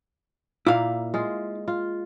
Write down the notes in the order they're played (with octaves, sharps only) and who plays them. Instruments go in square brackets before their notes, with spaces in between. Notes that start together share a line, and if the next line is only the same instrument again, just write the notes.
[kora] A#2 A#3 [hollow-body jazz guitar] E4 F5
[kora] G#3 F4
F4